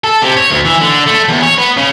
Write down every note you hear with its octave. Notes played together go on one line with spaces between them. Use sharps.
A4
C3
C#5
D2
E3
D3
A3
E2
C#5
B3
C#3